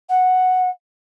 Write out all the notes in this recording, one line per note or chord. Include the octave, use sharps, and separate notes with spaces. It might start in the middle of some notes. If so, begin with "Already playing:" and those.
F#5